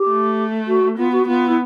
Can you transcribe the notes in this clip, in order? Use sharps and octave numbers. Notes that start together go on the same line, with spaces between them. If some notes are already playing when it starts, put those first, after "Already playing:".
Already playing: G4
A3
F#4
B3 F4
F#4
B3 F4
E4